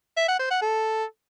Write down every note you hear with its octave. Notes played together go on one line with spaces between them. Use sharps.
E5
F#5
C5
F#5
A4